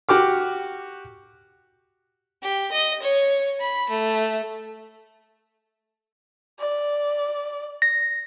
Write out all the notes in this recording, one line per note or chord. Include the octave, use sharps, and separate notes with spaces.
F#4 G4 D6 F6
G4
D#5
C#5
B5
A3
D5
A#6